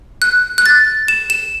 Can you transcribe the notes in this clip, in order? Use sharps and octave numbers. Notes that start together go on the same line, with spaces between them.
F#6
F#6
A6
E7
E7